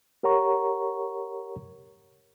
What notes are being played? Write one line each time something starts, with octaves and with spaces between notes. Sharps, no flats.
G4 A#4 C#5 F#5 A#5 C#6